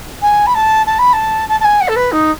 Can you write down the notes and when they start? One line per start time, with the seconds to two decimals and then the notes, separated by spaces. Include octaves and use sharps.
0.21 G#5
0.46 B5
0.54 A5
0.86 A5
0.98 B5
1.13 A5
1.48 A5
1.60 A5
1.64 G#5
1.81 F#5
1.88 A4
1.96 B4
2.12 D#4